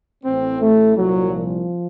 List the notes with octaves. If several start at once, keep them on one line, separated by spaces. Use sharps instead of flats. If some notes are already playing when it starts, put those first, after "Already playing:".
A1 A2 C4
A3
C2 A#2 F#3
F3